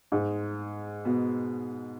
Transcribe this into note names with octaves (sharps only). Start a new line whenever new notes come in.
G#2
B2